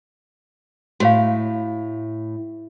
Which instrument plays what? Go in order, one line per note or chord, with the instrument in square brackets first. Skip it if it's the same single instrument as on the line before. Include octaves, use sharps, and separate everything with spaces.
[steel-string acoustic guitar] A2 [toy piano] F#4 C#5 F5